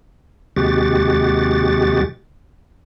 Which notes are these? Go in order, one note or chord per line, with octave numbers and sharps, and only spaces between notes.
D#2 C3 G#3 F#4 G4 A6